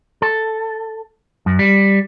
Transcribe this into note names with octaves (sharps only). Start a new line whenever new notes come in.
A4
F#2
G3